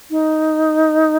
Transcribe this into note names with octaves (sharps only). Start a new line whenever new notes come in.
D#4